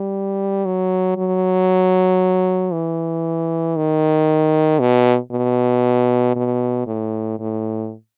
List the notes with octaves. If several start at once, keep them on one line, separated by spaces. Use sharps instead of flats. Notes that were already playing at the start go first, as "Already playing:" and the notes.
Already playing: G3
F#3
F#3
E3
D#3
B2
B2
B2
A2
A2